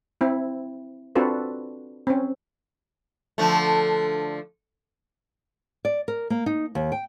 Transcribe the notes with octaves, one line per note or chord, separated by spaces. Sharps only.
C4 E4
C4 D4 F4 F#4 A4 B4
C4 C#4
D3 F3 A3
D5
A#4
A#3
D#4
D#2
G5